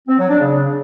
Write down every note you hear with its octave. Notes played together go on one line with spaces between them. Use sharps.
C4
F#3
D4
C#3